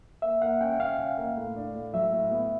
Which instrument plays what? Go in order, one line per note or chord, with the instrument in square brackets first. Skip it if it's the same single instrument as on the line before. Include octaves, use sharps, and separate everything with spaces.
[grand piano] A#3 [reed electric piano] E5
[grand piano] A#3 [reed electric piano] F#5
[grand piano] C#4 [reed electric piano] G5
[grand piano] C#4 [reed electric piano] F5
[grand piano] C#4
A#3
A2
D4
A2
[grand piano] F#3 [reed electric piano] E5
[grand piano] A2
B3